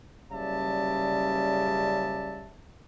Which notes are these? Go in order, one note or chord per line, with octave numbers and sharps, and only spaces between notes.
F#1 C#3 G3 D5 E5 A5